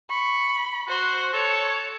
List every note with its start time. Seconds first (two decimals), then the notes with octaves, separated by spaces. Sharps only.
0.10 B5 C#6
0.89 F#4 C5
1.33 A4 C#5